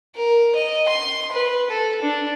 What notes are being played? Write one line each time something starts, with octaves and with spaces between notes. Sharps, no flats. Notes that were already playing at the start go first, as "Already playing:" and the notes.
A#4
D#5
C6
B4
A4
D4